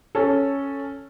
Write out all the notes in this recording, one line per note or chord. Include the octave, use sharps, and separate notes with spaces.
C#4 A4